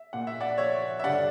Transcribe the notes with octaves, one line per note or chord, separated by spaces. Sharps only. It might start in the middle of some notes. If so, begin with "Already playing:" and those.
Already playing: E5
A#2 F#5
E5
D5 F#5
C#5 E5
E5
G2 D3 D5 F#5